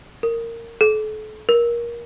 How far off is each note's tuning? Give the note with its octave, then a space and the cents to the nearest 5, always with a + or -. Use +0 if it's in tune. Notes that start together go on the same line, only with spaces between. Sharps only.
A#4 -15
A4 -40
A#4 +20